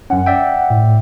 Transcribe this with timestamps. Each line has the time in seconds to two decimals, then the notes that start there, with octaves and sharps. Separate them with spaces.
0.10 F#2 C#4 F#5
0.26 D5 E5 G5
0.70 A2